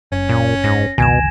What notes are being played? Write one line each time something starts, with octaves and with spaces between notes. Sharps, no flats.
F#1 C#4
A#2
G#2 A#6
F#1 C#2 B2 D#3 G#5 G#6 E7